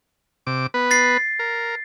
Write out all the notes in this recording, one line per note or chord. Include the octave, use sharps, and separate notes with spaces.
C3 D6
B3 B4
A6 C7
A#4